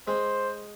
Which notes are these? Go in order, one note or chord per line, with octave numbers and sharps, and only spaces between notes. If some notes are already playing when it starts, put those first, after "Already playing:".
G#3 C5